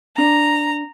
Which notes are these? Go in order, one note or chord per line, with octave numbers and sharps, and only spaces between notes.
D4 A#5